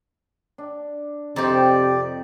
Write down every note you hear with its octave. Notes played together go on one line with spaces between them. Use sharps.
D4
F2 C3 D#4 G4 C5 D5 G5